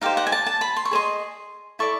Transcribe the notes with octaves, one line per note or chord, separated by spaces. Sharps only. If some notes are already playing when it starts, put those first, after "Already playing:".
D#4 G4 C5 F5
F#5
G#5
A5
A5
B5
C6
C#6
G#4 C5 D#5 C6
E4 A4 D5 C#6